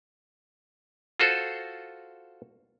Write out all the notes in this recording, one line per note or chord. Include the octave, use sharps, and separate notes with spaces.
F4 F#4 A4 C5